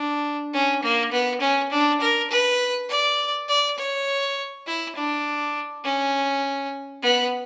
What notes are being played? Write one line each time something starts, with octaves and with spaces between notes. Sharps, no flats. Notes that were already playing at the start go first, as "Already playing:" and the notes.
Already playing: D4
C#4
A#3
B3
C#4
D4
A#4
B4
D5
D5
C#5
E4
D4
C#4
B3